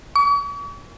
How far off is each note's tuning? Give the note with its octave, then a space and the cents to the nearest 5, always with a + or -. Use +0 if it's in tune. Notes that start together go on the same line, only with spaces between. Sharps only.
C#6 +45